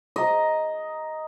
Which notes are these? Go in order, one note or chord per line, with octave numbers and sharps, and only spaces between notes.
D#5 A#5